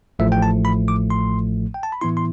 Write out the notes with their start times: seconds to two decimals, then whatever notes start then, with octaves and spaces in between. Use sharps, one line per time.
0.19 A1 A2 F3 A3 E5
0.32 G5
0.42 A5
0.65 B5
0.88 D6
1.10 C6
1.74 G5
1.83 A5
1.92 B5
2.01 A2 E3 B3 E4 C6
2.17 C6